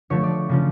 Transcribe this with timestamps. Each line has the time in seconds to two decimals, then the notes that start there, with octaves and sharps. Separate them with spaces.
0.10 D3 F3 A3 C#5
0.23 D5
0.49 C#3 F3 C#4